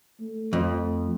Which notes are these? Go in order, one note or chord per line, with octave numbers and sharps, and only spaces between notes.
A3
F2